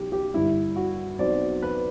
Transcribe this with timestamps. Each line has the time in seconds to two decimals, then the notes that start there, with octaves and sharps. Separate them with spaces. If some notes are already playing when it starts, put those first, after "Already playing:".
Already playing: B1 B2 F#3 G4
0.12 G4
0.34 G2 D3 G3 E4
0.76 F#4
1.19 B1 B2 F#3 C4 D5
1.62 B4